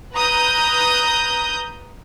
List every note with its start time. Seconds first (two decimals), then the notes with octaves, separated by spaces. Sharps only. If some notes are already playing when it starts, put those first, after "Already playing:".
0.13 B4 A#5 D#6 G6